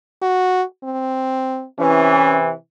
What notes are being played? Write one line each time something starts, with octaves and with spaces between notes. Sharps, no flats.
F#4
C4
C3 E3 C#4